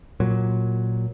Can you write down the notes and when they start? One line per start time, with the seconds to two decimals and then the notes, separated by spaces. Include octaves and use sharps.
0.20 A#2 F#3